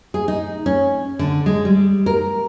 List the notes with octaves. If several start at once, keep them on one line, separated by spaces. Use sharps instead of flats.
G#4
D#4
C#4
D3
G#3
G3
A#4